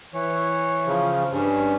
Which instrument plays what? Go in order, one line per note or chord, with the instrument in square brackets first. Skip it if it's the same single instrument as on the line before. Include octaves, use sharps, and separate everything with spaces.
[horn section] E3 C#5
[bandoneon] C#3 F3
[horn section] G2 [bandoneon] C#4